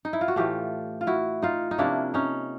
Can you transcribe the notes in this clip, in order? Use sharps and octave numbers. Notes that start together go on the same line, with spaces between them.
D#4
E4
F4
F#4
A2 E3 A3 F4 G4
F4
E4 F#4
D#4 F4
D#4
C3 F3 A#3 C#4 D4 E4
C#4 D#4